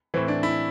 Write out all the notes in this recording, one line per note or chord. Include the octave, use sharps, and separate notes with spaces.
A2 E3 C4
D4
E4